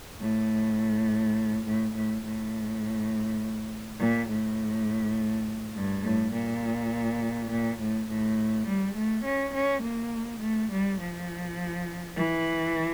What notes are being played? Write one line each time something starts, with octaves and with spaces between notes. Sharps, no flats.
A2
A2
A2
A2
A#2
A2
G2
A2
A#2
A#2
A2
A2
G3
A3
C#4
C#4
A#3
A3
G3
F3
E3